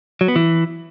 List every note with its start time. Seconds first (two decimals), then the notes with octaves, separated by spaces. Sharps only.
0.21 F#3
0.28 B3
0.36 E3